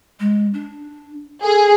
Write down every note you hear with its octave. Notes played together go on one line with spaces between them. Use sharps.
G#3
D4
G#4 A4